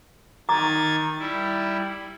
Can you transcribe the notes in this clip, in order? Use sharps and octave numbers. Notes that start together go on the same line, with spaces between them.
D#3 A#5 D6 G#6 A6
G3 E4